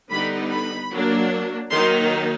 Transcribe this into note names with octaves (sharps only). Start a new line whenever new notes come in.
D3 G3 B3 D#4 B5
B5
F#3 A#3 D4
D#3 F#3 A#3 D#4 C6